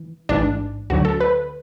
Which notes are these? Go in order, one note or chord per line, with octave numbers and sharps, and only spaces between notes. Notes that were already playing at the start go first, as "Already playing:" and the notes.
Already playing: E3
A1 G#2 E3 D4
D2 D3 F#3 F#4
A4
B4